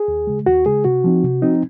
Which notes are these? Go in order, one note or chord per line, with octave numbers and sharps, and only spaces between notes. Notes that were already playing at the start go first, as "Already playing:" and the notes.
Already playing: G#4
D#2
C#3 G#3
D#2 F#4
C#3 G#3 G#4
C3 F#4
F3 C4 D#4
C3
F3 C4 D#4